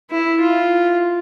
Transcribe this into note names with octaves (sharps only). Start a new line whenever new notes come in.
E4
F4